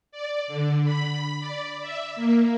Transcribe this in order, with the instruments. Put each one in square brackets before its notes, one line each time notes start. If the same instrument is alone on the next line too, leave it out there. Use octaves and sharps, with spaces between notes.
[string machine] D5
D3
B5
D5
E5
A#3